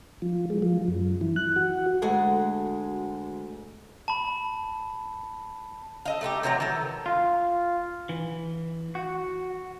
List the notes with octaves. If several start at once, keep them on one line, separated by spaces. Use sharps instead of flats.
F3
G#3
F3
F#2
E3
F#6
F#4
D2 G#3 F#4 G#4 A4 F#5
A5 B5
A4 D#5 F5
A3 D#4 F4 G4
C3 E3 F#3 A#5
D#3 E3 A4
F4
E3
F#4